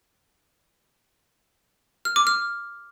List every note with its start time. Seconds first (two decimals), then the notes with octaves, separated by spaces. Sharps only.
2.05 F6
2.16 D6
2.27 F6